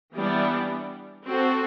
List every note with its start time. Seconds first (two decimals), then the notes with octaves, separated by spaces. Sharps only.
0.15 E3 G3 B3 D4
1.27 C4 F#4 A4